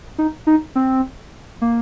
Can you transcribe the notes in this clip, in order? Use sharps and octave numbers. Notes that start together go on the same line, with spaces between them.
D#4
D#4
C4
A#3